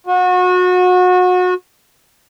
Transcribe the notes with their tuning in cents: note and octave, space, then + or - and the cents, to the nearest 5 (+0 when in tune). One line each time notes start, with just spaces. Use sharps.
F#4 -30